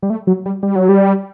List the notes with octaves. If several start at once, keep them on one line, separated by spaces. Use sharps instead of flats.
G3
A3
F#3
G3
G3
F#3
G3